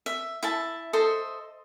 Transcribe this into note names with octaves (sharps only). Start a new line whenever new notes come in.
E5
E4 E5 A5
A4 C5 D#5 E5